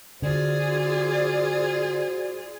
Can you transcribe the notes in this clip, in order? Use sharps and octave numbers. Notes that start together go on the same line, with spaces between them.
D3 F4 F#4 G#4 C5 D5